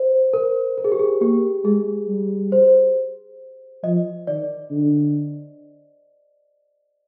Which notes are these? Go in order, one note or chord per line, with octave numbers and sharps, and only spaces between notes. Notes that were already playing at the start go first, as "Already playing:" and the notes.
Already playing: C5
A#4
A#4
G#4
G4
G#4
A#3 G4
G#3 G#4
G3
C5
F3 D#5
D#3 D5
D3